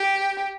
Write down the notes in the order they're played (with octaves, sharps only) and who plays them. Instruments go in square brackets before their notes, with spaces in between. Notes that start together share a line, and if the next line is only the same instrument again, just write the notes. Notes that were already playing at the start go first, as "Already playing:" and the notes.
Already playing: [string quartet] G4